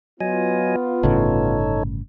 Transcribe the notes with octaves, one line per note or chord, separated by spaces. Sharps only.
F#3 B3 F4 D#5 G#5
G1 A2 C#3 D#4 A4 C#5